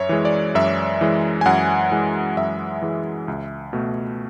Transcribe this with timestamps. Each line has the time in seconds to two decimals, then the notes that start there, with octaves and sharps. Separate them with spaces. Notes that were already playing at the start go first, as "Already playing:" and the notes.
Already playing: F#2 C#5 E5
0.09 E3 G#3
0.25 D5
0.55 F#2 E5
1.01 E3 G#3
1.41 G#5
1.46 F#2 F#5
1.91 E3 G#3
2.37 F#2 E5
2.82 E3 G#3
3.28 C#2
3.73 B2 A3